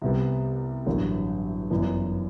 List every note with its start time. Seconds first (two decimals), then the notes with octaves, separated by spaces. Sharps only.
0.02 C2 C3 G3 B3
0.86 A1 G2 D3 F#3
1.70 G1 F#2 E3 B3